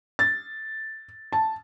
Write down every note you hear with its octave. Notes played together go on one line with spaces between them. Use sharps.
A6
A5